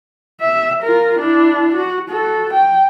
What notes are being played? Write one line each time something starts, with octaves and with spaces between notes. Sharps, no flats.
E5
F4 A#4
D4 E4
F#4
F#4 A4
G5